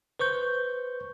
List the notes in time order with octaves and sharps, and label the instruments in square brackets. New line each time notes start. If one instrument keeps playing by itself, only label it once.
[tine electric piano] B4 C5 C#6 G6